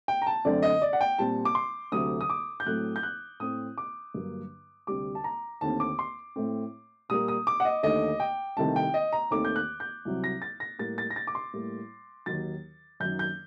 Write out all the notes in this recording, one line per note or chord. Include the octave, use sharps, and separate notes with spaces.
G5
A#5
A5
F#2 D3 A3 C4 D5
D#5
D5
F#5
G5
A#2 G3 C4 A5
D6
C6
D2 C3 F#3 A3 D#6
D#6
D6
G6
A2 F#3 A3 C4 F#6
G6
F#6
A2 A3 C4 D#6
D6
G2 D3 F#3 A#3
D2 C3 G3 D6
A5
A#5
D#2 D3 A3 C4 A5
D6
C6
A2 A3 C4
A#2 G3 A#3 D#6
D#6
D6
F#5
D#5
D#2 D3 A3 D#5
G5
C2 C3 D#3 A3 C4 A5
G5
D#5
A#5
D#2 D#3 A3 C4 D6
G6
F#6
G6
C2 C3 F#3
A#6
A6
A#6
A2 G3 A#3 A6
A6
A#6
A6
D6
C6
A2 G3 A#3
D#2 D#3 F#3 A6
F#2 D#3 F#3 G6
G6